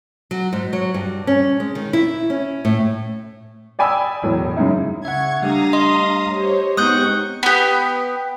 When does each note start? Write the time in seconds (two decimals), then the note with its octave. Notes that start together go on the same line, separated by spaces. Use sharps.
0.31 F#3
0.53 G#2
0.73 F#3
0.94 G2
1.27 C#4
1.60 G#3
1.75 D#3
1.93 E4
2.30 C#4
2.65 A2
3.79 D5 G5 G#5 B5 D#6 E6
4.22 E1 A2 F#3
4.57 F#2 C#3 D#4 E4
5.05 C#3 E5 F#5 C#6 G#6
5.42 G3 A3 D4 G4 F5 A#5 D#6
5.73 D#5 C6
6.34 G4 C5 C#5
6.77 G#3 B3 C4 D#4 C#6 D#6 F#6 G6
7.43 B3 G4